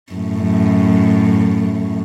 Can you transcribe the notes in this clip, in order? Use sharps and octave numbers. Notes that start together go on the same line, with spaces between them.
F#2 A2